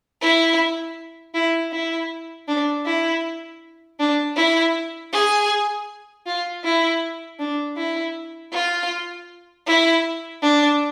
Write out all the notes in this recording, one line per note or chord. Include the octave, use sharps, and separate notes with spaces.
E4
E4
E4
D4
E4
D4
E4
G#4
F4
E4
D4
E4
F4
E4
D4